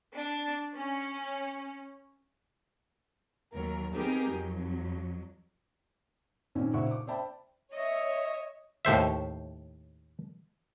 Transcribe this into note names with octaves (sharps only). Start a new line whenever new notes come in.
D4
C#4
D#2 F#3 A#4
B3 C4 D#4 G4 G#4 A#4
F2 F#3
A#2 D#3 A#3 C4 C#4 D#4
A#2 C#3 C5 E5 F#5 C#6
D6
C5 D5 E5 G5 A5 B5
C#5 D#5 E5
D#2 A2 C5 E5